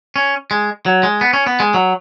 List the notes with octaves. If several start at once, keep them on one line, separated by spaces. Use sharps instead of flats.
C#4
G#3
F#3
G#3
B3
C#4
B3
G#3
F#3